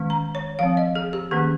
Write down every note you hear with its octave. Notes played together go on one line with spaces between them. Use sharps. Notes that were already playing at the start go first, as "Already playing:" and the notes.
Already playing: D#3 G#3 C#4
A#5
C#5
F3 C4 F5
D#5
G#4
G4
D#3 A#3 C#4 G#4